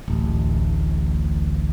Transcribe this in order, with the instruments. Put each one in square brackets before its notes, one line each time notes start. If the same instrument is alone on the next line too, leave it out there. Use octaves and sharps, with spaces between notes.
[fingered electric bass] D1 A1